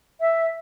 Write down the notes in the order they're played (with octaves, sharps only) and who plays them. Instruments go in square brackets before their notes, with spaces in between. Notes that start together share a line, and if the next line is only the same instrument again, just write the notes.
[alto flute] E5